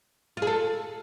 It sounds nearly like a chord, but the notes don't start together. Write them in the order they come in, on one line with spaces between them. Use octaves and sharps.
F4 G#4 A4